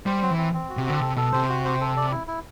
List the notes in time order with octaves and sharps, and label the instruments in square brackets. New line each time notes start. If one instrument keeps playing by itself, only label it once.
[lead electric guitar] G3 [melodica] C5
[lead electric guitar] F#3 [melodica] C4
[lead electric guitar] E3
[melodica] C4
C4
F#4
[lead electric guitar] C3
[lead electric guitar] D3 [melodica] C4
[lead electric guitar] C3 [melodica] A4
[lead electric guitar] B2 [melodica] A4
[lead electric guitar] C3 [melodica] C5
[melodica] F#4
C5
A4
D5
E4
E4